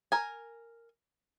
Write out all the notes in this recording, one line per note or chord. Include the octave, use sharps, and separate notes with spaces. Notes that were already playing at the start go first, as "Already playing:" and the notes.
A#4 G#5